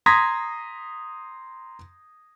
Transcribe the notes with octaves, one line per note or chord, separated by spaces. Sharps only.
A#5 C6 D#6 G#6 A#6 B6